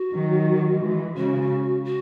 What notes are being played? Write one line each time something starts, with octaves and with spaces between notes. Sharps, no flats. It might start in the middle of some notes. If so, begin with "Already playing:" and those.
Already playing: F#4
D#3 F#3
E3 G#3
C#3 F#4
F#4